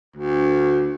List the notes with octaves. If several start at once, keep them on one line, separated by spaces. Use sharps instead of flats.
D2